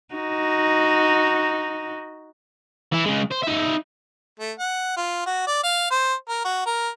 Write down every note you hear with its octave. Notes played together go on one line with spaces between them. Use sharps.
D#4 F#4
E3 E4
C#3 G#3
C5
D#4 E5
A3
F#5
F4
F#4
D5
F5
C5
A#4
F#4
A#4